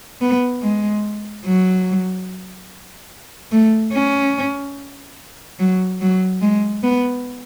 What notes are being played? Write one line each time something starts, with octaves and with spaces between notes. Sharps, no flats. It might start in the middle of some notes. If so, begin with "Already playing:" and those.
B3
G#3
F#3
A3
C#4
F#3
F#3
G#3
B3